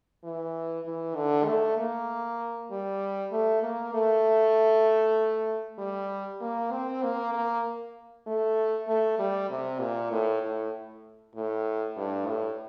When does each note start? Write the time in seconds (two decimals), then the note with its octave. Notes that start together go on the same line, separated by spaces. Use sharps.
0.24 E3
0.86 E3
1.16 D3
1.46 A3
1.78 A#3
2.71 G3
3.32 A3
3.63 A#3
3.94 A3
5.79 G3
6.41 A#3
6.72 C4
7.03 A#3
7.33 A#3
8.27 A3
8.88 A3
9.19 G3
9.50 C3
9.80 A#2
10.11 A2
10.42 A2
11.36 A2
11.97 G2
12.27 A2